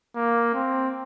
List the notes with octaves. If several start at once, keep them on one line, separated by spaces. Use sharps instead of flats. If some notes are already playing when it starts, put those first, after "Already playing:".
A#3
C4